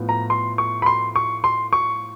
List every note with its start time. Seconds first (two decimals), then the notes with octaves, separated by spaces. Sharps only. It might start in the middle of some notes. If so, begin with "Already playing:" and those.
Already playing: A2 F3 B3
0.09 A#5
0.30 C6
0.58 C#6
0.82 B5
0.86 C6
1.16 C#6
1.44 C6
1.73 C#6